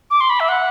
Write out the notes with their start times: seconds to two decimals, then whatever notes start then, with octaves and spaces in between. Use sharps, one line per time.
0.11 D6
0.21 C6
0.30 B5
0.40 E5
0.49 F#5